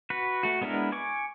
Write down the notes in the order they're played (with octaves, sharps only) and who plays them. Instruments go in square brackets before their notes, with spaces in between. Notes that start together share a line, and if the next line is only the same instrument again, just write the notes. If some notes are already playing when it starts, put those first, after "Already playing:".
[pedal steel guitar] F#4 B4
A3 F#4
G#3 B3 D4 E4 A#4
G#5 C#6 D6